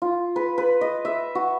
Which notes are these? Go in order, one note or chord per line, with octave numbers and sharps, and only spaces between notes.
F4
B4
B4
D#5
E5
F#4